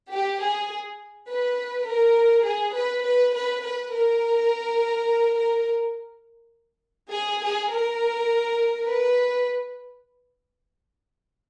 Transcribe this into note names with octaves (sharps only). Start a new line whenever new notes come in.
G4
G#4
B4
A#4
G#4
B4
B4
B4
B4
A#4
A#4
G#4
G#4
A#4
B4